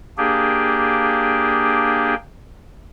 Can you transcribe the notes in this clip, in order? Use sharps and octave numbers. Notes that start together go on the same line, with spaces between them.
A#3 D4 G4 G#4